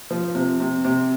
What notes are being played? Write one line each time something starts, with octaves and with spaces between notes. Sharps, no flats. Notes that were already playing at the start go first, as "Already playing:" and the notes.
F3
C3
C3
C3